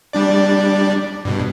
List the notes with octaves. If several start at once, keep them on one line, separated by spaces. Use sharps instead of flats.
G3 D4 D5
G2 B2